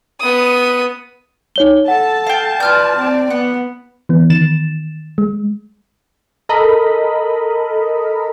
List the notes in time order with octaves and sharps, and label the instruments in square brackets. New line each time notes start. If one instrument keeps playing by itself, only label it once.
[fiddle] B3 D#6
[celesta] D#4 C#5 G7
[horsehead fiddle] A4 [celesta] F#5 [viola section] A5
[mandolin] F5 G5
[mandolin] F4 F6 G6 [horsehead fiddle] B4 D5
[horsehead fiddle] C4 D5
[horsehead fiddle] B3 [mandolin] F#5
[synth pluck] E3 B3
D#3 A6 E7
G#3
[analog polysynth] A4 A#4 D#5 B5